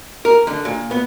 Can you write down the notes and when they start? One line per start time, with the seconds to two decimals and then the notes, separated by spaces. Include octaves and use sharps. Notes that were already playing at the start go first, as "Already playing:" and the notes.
0.25 A#4
0.47 D3
0.65 A#2
0.91 B3